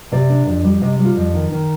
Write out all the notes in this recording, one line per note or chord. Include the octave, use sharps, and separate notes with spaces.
C3 D5
D4
F2
G3
C3 D#5
G3
F4
F2
D#3
D#3